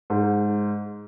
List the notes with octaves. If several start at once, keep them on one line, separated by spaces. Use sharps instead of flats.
G#2